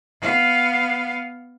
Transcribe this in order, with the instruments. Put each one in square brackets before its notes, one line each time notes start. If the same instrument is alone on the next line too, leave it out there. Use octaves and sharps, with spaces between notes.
[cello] B3 F5